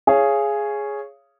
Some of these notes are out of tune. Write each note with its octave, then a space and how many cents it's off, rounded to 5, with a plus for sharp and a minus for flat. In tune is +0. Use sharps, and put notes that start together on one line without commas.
G#4 +0 C#5 +0 F5 -30